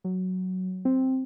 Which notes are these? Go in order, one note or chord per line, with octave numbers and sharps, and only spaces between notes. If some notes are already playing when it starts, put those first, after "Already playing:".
F#3
C4